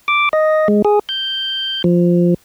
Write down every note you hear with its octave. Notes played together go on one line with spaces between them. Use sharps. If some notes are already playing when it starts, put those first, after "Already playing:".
D6
D#5
G#3
G#4
G6
F3